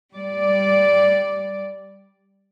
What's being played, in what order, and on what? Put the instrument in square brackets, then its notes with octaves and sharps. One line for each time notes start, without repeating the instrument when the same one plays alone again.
[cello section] G3 D5